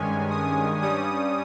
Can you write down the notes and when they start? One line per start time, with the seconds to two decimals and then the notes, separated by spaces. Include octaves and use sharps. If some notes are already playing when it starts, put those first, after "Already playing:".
Already playing: G2 D#3 G#3 C#4 G#5
0.31 D#6
0.82 G2 G3 C#4 D#6